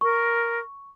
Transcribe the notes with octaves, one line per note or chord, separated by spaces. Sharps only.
A#4 C#6